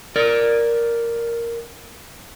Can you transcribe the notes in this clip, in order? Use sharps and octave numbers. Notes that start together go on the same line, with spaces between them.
A#4 D5